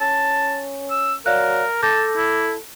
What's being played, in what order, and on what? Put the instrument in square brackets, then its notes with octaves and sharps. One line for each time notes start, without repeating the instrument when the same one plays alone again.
[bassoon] C#4 [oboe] A5
[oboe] E6
[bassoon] F#3 [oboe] A#4 [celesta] D5 F5 F#6
[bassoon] A4 [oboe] A5 [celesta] D6 G6 A#6
[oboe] E4